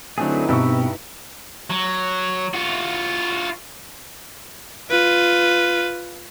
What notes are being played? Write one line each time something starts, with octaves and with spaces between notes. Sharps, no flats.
D3 F#3 A3 C4 D#4 E4 G#4 B4
G2 B2 B3 C4 G5 C#6 E6
F#3
F4 F#4
F4 B4